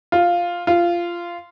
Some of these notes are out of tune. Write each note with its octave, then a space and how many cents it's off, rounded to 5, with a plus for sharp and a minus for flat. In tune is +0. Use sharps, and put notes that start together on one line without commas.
F4 +0
F4 -15